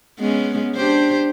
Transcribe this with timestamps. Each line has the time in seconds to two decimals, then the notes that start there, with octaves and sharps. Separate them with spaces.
0.19 G#3 B3 C#4
0.76 D4 G4 C5